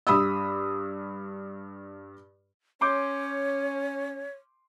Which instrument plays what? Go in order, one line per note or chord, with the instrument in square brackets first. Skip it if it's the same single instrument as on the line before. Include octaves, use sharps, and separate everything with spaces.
[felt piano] G2 B5 D#6 E6
[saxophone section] C#4 [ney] C#5 [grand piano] C6 D6 G6